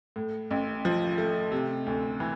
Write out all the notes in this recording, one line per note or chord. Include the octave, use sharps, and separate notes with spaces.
A2
A1
F3
A3
C3
D2
E3